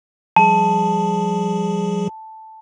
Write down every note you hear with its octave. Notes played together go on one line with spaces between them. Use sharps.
F3 G3 G#4 A5